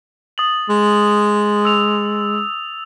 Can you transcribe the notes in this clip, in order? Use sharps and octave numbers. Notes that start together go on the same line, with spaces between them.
D#6 A6 F#7
G#3
E6 F7